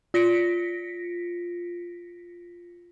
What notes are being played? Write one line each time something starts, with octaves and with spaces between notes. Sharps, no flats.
F4 A#6 B6 C#7 D7